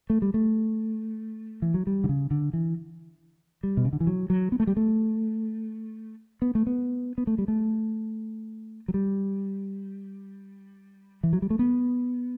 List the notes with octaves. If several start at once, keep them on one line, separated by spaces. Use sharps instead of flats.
A3
G3
A3
E3
F#3
G3
D3
C#3
D3
E3
G3
B2
C#3
D3
E3
F#3
F#3
B3
A3
G3
A3
B3
A3
B3
B3
A3
G3
A3
F#3
G3
E3
F#3
G3
A3
B3